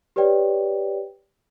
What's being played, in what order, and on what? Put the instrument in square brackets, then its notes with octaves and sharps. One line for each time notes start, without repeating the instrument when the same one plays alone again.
[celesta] G4 B4 C#5 D5 G5